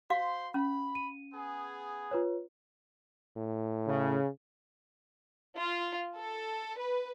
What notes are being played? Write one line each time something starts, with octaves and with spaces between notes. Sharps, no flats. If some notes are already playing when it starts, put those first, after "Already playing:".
F#4 C5 F5 C6
C#4 B5
D#7
B3 G#4
F4 B4 C#5
A2
C#3
F4
A4
B4